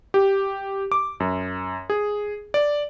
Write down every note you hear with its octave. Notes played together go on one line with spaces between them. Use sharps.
G4
D6
F#2
G#4
D5